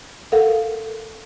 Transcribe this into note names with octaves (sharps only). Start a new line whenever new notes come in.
A4 A#4 F5 F#5